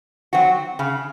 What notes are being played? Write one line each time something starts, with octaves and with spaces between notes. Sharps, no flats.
F#3 C4 F#4
C#3